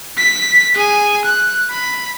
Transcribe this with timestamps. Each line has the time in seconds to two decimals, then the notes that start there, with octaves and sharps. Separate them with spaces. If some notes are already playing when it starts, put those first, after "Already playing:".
0.17 B6
0.75 G#4 G#5
1.24 F#6
1.70 B5